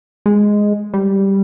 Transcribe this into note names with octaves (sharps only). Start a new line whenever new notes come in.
G#3
G3